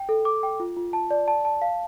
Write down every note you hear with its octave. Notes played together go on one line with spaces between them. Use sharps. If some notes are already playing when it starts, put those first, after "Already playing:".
Already playing: G5
A4
D6
G5
F4
F4
A5
D5
A5
A5
F5